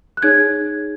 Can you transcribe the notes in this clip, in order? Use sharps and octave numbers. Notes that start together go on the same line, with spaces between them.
F#6
D#4 G#4 C#5 G#6